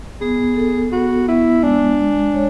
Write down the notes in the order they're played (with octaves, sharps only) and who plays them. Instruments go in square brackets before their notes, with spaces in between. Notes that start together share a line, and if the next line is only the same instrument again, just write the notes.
[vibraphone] B3 [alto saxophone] G#4
[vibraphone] A4
[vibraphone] B3 [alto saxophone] F#4
[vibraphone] B3 [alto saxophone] E4
[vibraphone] G#3 [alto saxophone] D4
[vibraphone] G#3
C#5